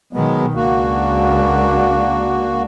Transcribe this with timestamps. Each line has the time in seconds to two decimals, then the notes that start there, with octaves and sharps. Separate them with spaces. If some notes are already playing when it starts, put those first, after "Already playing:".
0.13 B2 D#3 F#3 G#3 B3
0.55 C#2 A#3 D4 F#4